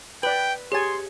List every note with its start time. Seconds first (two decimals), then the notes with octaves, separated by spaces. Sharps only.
0.23 B4 D5 G5 F#7
0.72 G4 G#4 C#5 G#5 C6 A6